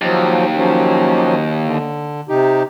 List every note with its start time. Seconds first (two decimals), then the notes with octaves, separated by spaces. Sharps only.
0.02 D#2 F3 F#3
0.57 F3 F#3 C#4
1.65 D3
2.29 C3 D#4 G4